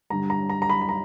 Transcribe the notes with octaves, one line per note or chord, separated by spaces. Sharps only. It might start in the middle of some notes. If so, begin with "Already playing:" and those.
G2 D3 G3 A#5
A#5
A#5
A#5
B5
B5
A#5